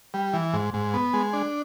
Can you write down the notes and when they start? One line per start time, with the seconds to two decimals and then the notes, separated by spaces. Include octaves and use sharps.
0.14 G3
0.33 E3
0.53 G#2
0.74 G#2
0.94 B3
1.13 G#3
1.33 D4